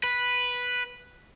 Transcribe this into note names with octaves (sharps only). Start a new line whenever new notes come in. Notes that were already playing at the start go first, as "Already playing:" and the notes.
B4